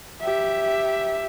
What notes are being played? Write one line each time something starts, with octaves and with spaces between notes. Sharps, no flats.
G4 E5